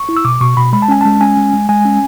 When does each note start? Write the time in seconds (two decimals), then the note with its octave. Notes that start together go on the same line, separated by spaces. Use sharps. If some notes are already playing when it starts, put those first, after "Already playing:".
Already playing: C#6
0.09 E4
0.17 E6
0.25 B2 D6
0.41 B2 C#6
0.57 B2 B5
0.73 G#3 B5
0.82 A5
0.88 C#4 G#5
1.01 G#3 A5
1.21 C#4 G#5
1.37 G#3
1.53 G#3
1.69 G#3 G#5
1.85 C#4